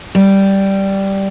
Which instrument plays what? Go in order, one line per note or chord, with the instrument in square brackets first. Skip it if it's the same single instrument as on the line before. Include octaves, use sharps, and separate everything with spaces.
[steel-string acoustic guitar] G3